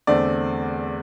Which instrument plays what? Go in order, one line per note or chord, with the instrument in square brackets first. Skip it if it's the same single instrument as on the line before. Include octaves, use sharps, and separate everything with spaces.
[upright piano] E2 D3 A3 C4 D5